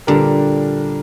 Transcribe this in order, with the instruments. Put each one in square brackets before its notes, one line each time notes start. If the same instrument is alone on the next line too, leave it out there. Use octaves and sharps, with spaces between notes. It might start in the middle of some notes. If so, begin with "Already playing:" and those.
[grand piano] A#2 G3 D4 G4 A#4 [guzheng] D3